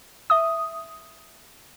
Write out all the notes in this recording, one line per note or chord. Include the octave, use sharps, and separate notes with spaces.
E5 D#6